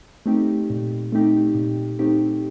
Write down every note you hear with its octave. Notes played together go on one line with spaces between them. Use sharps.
A3 C4 D#4 G4
A#2
A3 C4 D#4 G4
A#2
A3 C4 D#4 G4